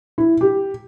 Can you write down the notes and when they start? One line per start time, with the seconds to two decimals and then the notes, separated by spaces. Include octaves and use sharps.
0.18 E4
0.41 G4